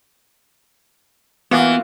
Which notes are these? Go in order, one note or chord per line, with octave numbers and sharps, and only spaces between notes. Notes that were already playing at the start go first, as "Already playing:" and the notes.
E3 A#3 B3 F4 F#4